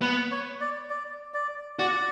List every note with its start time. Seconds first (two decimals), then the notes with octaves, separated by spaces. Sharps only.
0.01 B3 B4
0.31 C#5
0.61 D5
0.90 D5
1.34 D5
1.79 F#4 D5